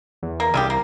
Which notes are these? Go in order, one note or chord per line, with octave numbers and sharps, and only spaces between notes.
E2
A#3
C2 C#3 E4 G4
A#3